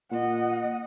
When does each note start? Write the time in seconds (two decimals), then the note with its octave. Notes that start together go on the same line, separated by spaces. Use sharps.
0.11 A#2 D#5 F#5